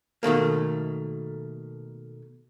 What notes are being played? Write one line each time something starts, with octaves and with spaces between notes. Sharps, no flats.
B2 D#3 A3 A#3